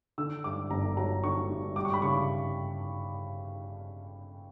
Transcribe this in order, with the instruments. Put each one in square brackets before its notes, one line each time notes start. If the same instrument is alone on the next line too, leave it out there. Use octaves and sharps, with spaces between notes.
[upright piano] D3 E6
G2 D6
G1 A#5
F#3 A#5
D3 C#6
G2
G3 D6
C#6
B5
C#3 C#6